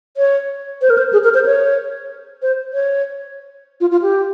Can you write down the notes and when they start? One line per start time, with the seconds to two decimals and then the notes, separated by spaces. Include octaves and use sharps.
0.17 C#5
0.82 C5
0.90 A#4
0.98 C5
1.13 G#4
1.24 A#4
1.34 C5
1.46 C#5
2.42 C5
2.73 C#5
3.81 F4
3.91 F4
4.02 G4